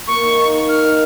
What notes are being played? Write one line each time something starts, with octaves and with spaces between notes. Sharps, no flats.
A#3 C#6
D#3
D#4
D#3
D#4 F6
D#3